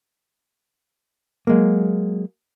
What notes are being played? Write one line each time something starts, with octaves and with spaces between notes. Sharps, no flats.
F#3 G#3 A#3